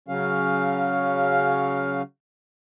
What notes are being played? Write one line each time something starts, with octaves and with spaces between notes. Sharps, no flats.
C#3 F#3 C#4 F5